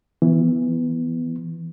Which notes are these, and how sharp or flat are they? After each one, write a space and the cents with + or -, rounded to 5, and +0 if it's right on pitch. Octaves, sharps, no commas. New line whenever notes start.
E3 +0 B3 +0